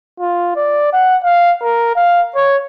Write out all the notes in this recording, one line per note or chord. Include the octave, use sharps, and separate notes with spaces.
F4
D5
F#5
F5
A#4
F5
C#5